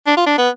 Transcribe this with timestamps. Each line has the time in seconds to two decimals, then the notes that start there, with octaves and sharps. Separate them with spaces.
0.07 D4
0.17 F4
0.26 D4
0.38 B3